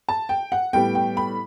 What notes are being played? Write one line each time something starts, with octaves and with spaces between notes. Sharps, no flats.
A5
G5
F#5
A2 G3 B3 G5
G5
B5